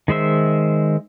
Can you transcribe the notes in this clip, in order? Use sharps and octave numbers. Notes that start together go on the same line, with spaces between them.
D#3 G#3 C5 E5